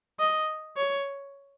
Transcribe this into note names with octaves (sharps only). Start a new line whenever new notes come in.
D#5
C#5